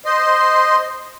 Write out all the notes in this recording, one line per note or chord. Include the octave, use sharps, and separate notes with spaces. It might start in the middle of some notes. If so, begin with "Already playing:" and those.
C5 D#5 C6